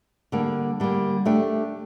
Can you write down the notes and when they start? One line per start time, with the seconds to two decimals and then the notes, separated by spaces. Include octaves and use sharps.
0.32 D3 G3 A#3
0.80 D3 G3 A#3
1.25 A3 D4 G4